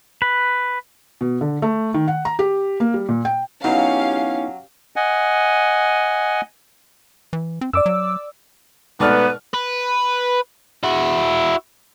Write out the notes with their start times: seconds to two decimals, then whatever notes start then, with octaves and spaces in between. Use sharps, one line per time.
0.22 B4
1.21 B2
1.41 D3
1.62 A3
1.94 D#3
2.08 F#5
2.25 A#5
2.39 G4
2.80 A#3
2.94 G3
3.09 A#2
3.25 G5
3.64 F#3 B3 C#4 D#4 E4 G4 F5
4.96 D#5 F#5 G#5
7.33 E3
7.61 C4
7.73 F#2 D5 D6 E6
7.86 F#3
9.00 G#2 B2 A3 B3 B4 D5 F6
9.54 B4
10.84 E4 F#4